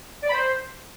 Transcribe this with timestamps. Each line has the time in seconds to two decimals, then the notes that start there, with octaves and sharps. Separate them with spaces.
0.23 D5
0.28 B5
0.33 C5